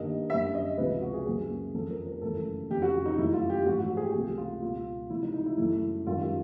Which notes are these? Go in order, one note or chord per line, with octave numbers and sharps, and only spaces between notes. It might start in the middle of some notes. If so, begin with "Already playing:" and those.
Already playing: G1 G2 D#3 G3 A#3 D#5
F#2 D3 G3 E5
D#5
C#2 C3 F3 G#3 B4
F#4
G#4
F#2 C#3 F#3 A#3 G#4
G1 F2 C#3 F3 G#3 A4
A#4
A#4
G#1 F#2 C#3 E3 A3 A4
F2 C#3 F3 G4
F#4
D#4
F#2 C#3 F3 A3 E4
F4
G4
A1 G#2 F3 F#4
F#4
F#4
G#4
G4
C#2 C3 F3 A3 G4
F4
C#2 B2 G#3 F4
C#2 C3 F3 E4
D#4
D#4
E4
G1 F#2 C#3 F#3 A3 E4
G#1 F#2 D#3 G3 F4